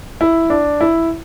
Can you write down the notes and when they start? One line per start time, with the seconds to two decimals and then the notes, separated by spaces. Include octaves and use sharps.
0.21 E4
0.50 D4
0.81 E4